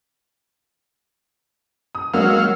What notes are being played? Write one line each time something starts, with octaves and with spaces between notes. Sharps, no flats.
D#6
F#3 G#3 A#3 F5 E6